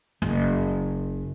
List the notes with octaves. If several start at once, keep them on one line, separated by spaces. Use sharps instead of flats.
F#1